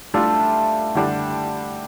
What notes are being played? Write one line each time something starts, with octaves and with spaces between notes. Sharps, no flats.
G3 A3 D4 F4
D3 G3 D4